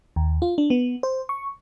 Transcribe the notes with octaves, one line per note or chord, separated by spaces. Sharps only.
D#2
F4
D4
B3
C5
C#6